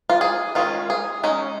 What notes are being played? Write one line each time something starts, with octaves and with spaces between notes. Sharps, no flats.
F4
G#4
D#3 G#3 C#4 F4
G#4
G#3 C#4 D#4